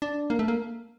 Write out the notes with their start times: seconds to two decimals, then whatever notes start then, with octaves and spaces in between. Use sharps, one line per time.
0.02 D4
0.30 A#3
0.39 A3
0.48 A#3